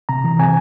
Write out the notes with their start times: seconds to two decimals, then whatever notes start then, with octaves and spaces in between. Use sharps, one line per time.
0.09 C3 A#5
0.24 E3
0.39 C3 G#5